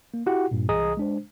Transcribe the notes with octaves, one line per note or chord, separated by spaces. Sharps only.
A#3
E4 F#4 G4 F#5
G2 A#2
C2 E3 G#4 D#5 A#5 D#6
G#3 D4 C5